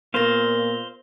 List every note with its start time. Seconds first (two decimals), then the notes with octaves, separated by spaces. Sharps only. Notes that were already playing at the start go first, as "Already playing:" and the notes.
0.14 A#2 B3 A#4 C5 F5 A#6